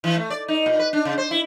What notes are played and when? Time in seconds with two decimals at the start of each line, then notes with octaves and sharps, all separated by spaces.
0.04 E3
0.16 A3
0.30 D5
0.48 D#4
0.66 A#2
0.79 B4
0.93 D4
1.05 C#3
1.18 C5
1.31 E4